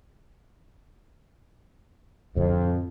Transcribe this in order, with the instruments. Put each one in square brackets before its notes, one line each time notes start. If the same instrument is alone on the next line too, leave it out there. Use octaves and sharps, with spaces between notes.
[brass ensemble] F2 [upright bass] A2 D3